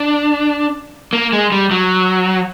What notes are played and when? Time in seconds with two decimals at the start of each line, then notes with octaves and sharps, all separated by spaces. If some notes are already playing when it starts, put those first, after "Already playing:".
Already playing: D4
1.13 A#3
1.32 G#3
1.52 G3
1.71 F#3